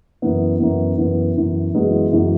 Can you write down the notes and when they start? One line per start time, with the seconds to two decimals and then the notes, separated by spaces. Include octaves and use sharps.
0.22 F#2 E3 B3
0.60 F#2 E3 B3
0.98 F#2 E3 B3
1.36 F#2 E3 B3
1.74 F#2 E3 G#3 B3 F#4
2.13 F#2 E3 G#3 B3 F#4